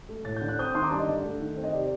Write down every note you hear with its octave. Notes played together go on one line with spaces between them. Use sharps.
A3
A2 A6
G6
D3
F#6
C4 D#6 G6
D#3 C6 D#6
A#5 D6
G2 A5 C6
D#5
D3
A3
D#3
C4
D#5
C3 D5